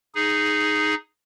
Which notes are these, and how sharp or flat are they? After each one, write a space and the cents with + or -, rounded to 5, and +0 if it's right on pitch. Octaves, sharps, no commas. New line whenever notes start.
D#4 -5 G#4 +0